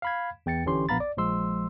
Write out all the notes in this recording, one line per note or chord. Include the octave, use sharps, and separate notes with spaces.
F5 B5 G#6
E2 G5 A6 C#7
G1 D3 E3 C#4 G4 C6
A#1 B3 F5 A#5 B5 A6
D5
A#1 F3 G#3 C6 E6